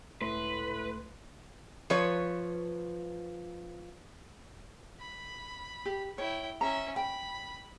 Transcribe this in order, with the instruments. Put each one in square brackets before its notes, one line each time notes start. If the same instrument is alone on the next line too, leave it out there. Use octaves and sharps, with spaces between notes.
[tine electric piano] C#2 A3 C6 [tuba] A2 [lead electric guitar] B4
[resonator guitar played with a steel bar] F3 B4 C#5
[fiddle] B5
[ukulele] G4
[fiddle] E4 G5 [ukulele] C#5
[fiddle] C#4 E5 [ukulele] A#5
[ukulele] G5 [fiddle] B5